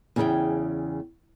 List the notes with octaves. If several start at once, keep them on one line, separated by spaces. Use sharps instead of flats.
E2 C#3 G#4 A#4 E5 G5